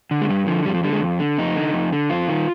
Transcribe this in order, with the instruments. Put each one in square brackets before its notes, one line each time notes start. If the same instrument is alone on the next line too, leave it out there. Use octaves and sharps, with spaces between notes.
[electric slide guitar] D3
G#3
G2 G3
D3 F3
F2 G3
F3
D3 G3
G#3
F2
D3
F2 D#4
D3
F2
D3
F2 F4
D#3